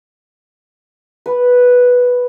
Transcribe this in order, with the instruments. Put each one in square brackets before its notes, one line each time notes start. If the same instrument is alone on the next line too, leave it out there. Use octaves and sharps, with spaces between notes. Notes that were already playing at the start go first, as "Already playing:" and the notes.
[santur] B4